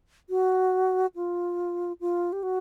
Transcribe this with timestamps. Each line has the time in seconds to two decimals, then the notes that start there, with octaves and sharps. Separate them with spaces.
0.30 F#4
1.16 F4
2.01 F4
2.32 G4
2.43 F#4